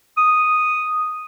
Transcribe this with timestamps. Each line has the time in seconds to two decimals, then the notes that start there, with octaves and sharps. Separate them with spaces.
0.17 D#6